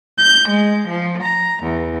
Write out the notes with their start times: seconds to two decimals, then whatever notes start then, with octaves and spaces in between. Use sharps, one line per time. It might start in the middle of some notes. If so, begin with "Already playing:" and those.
0.17 G6
0.49 G#3
0.87 F3
1.23 A#5
1.63 E2